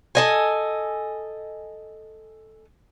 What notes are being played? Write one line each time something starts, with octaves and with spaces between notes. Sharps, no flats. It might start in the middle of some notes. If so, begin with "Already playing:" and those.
A4 D#5 G#5